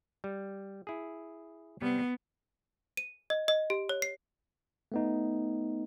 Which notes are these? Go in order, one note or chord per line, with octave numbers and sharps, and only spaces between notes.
G3
E4 G#4
C3 G3 B3
D#7
D#5
D#5
G4
C#5
C7
A3 B3 D#4